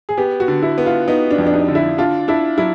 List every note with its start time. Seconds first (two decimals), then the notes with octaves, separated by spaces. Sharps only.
0.09 G#4
0.17 B3 G4
0.40 F#4
0.48 D3
0.63 E4
0.78 B3
0.86 F4
1.08 B3 D#4
1.31 D4
1.38 F2
1.47 D4
1.54 D#4
1.68 D3
1.75 E4
1.98 D4 F4
2.28 D4 E4
2.58 F#3 E4